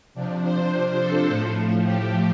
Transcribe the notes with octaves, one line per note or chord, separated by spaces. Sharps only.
C3 F3 D4
C5
A4
A2 F3 A3
G4